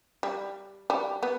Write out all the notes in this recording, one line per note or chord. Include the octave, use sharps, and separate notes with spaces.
G3
G3
B3